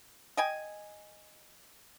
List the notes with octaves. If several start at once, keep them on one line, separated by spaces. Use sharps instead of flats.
D#5 G5 G#5